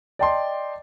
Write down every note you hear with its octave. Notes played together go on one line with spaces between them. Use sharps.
D5 D#5 G5 A5 C6